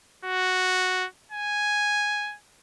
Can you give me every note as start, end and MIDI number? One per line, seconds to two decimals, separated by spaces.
0.25 1.07 66
1.32 2.36 80